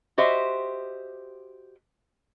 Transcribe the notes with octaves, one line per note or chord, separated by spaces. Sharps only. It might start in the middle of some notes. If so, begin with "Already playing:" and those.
F#4 G4 C5 D#5 E5